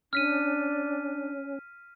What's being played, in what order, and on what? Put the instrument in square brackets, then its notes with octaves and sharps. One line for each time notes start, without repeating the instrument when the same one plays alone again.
[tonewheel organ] C#4 [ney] D4 [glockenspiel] F6 B6 D#7